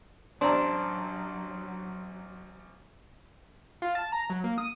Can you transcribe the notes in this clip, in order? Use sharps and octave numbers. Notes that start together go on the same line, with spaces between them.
A1 F#3 C4 D4 A#5 C6
F4
A5
A#5
F#3
A#3
D#6